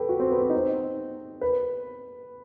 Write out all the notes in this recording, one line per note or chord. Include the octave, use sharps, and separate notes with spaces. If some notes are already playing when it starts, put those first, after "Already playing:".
Already playing: G4 A4 B4
F#4
C4
B3
C4
D#4
C4
B4